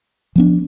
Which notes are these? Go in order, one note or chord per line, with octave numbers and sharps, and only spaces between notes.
F3 B3 D4